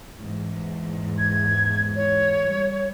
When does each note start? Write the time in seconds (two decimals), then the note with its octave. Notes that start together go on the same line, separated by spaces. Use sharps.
0.17 E2 G#2
1.18 G#6
1.95 C#5
2.45 G3